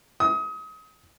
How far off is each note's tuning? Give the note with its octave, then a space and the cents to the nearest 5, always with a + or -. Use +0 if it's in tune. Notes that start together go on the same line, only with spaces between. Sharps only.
D#6 +30